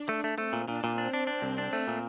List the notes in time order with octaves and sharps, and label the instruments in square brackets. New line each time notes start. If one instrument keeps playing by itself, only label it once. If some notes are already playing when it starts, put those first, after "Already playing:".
Already playing: [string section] D4
[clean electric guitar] A3
A3
[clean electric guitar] A3 [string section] C4
[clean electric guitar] A#2
[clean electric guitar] A#2 [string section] D4
[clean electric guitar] A#2
[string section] C4 [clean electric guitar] D4
[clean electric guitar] D4
D4
C2
D4
A3
A#2